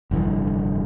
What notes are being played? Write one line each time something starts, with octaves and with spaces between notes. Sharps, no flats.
F1 G2 D3 E3